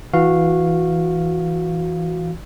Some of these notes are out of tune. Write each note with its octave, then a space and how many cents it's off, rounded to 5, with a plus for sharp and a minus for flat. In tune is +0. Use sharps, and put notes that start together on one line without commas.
E3 +0 F#4 -15 F5 -5